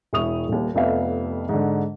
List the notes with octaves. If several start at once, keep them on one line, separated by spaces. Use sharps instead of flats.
E1 E4 C#6 D#6 F7
D#1 D#2
F1 F2 B3 E5 F5
G#2 D3